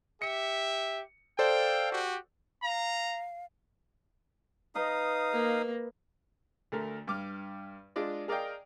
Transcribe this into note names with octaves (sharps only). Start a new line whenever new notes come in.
G4 E5 C#7
A4 C5 D5 F5 G5
F#4 G4
F5 A#5
D#4 B4 D#5 F5 A#5 D#6
A#3
D2 A3 A#4
G2 D6 F6
G#3 D4 F4 D5 D#5
G#4 A#4 D5 D#5 F5 G5